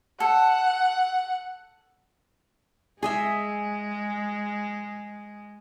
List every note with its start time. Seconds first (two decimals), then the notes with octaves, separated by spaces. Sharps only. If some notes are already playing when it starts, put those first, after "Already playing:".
0.20 A4 F#5
3.03 G#3 G#4 D#5 E5